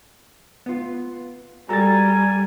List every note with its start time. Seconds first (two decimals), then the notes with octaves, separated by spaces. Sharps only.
0.66 B3 F4
1.69 G3 F#4 A4 A#4 G#5 A#5 A6